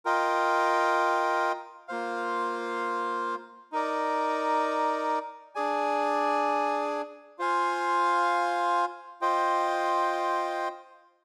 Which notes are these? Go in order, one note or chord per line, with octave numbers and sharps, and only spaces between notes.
F4 A#4 D#5 G5
A#3 F4 C5 F5
D#4 A#4 D5
D4 G#4 D5 G#5
F4 C5 F5 G#5
F4 C5 D#5 G5